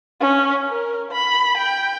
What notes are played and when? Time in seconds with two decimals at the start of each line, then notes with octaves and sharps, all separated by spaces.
0.20 C#4
0.68 A#4
1.11 B5
1.57 G5